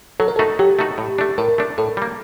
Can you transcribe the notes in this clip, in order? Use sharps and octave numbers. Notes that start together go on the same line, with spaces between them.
F#3 A4
A#4
A3 D#4 F#4 A4
F#3 G4
A3 D#4 F#4
A2
A3 D4
A2 A#4
A3 D4
A2 A4
G3 A#3